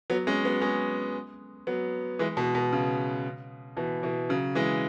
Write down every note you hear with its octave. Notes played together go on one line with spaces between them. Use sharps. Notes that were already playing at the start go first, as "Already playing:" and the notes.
F#3 B3
G#3 C#4
F#3 B3
G#3 C#4
F#3 B3
E3 G#3
B2
B2
C#3
B2 E3
B2 E3
C#3 F#3
E3 G#3